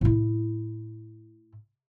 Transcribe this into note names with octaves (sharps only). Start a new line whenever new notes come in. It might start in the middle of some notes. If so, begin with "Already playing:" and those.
A2 E4